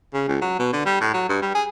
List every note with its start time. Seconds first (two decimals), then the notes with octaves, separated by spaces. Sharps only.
0.14 C#3
0.28 C#2
0.41 F#3
0.59 B2
0.73 D3
0.86 G3
1.01 A2
1.14 F#3
1.29 G2
1.42 G3
1.55 G#4